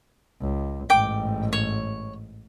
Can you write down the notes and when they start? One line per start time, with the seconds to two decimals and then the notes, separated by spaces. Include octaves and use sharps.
0.41 C#2
0.90 A1 G#2 G5 D6
1.53 C#5